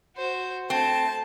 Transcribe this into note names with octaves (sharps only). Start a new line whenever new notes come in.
F#4 C5
A3 C4 A5